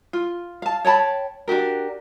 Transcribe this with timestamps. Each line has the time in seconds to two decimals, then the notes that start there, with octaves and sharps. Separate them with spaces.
0.13 F4
0.62 F5 A5
0.85 C#5 G5 A5 B5
1.48 D4 F#4 G4 A#4